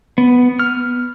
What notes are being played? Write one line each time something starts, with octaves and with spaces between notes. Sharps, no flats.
B3
F6